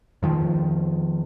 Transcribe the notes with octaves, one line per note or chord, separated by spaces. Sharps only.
F2 D#3 F3